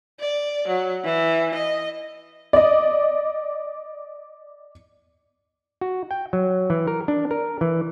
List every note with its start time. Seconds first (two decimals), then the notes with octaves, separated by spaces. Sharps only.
0.20 D5
0.68 F#3
1.04 E3
1.55 D#5
2.53 D5 D#5
5.81 F#4
6.11 G5
6.33 F#3
6.70 E3
6.87 A#4
7.08 D4
7.31 A#4
7.61 E3